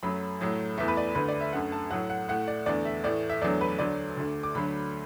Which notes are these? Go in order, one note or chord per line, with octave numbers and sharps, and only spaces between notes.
F#2 F#3 A3 B5
A2 F#3 A3
E2 E3 A3 E5
B4
D5
D2 D3 A3 B4
D5
E5
F#2 D3 A3 F#5
A5
A2 F#3 A3 F#5
F#5
A2 A3 F#5
D5
E2 D3 A3 D5
E5
A2 E3 A3 D5
E5
E2 D3 F#3 A3 D5
B4
D2 D3 F#3 A3 D5
D2 D3 A3
D6
D2 D3 F#3 A3 B5